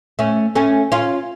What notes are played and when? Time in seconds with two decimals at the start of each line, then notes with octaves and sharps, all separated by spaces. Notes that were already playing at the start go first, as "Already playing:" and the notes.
0.19 A3 C#4
0.55 A3 C#4
0.92 C#4 F4